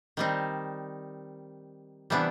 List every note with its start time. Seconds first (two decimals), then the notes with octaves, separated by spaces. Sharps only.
0.17 D#3 G3 C4 D#4
2.10 C3 E3 G3 B3 D4